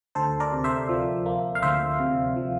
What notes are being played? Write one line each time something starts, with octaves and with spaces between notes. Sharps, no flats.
D2 A4 C5
A#4 D5
C3
C5 E5
F3
A#3
F5
D2 C5 E5
C3
F3